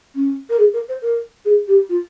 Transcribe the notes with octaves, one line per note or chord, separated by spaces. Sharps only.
C#4
A#4
G#4
A#4
C5
A#4
G#4
G4
F4